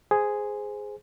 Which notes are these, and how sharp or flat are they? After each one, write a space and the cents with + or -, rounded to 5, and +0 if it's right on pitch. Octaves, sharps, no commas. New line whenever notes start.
G#4 +0 C5 -10